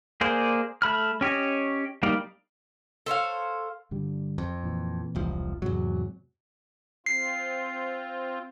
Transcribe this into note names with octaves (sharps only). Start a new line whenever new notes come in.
A#3 G#4 C5 D5
A3 B5 F6
C#4 G4 C#5 D#5
G3 A#3 D#4 D5 F5
A4 C5 C#5 F5
G2 D3 G3
F2
A#2 E3
E1 C2 F3
E2 G#2 C3 F#3 G#3
C4 F4 C7